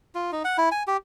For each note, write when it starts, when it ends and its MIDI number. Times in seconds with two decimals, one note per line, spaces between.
0.15 0.31 65
0.32 0.43 63
0.44 0.57 78
0.58 0.69 64
0.72 0.83 80
0.87 0.97 67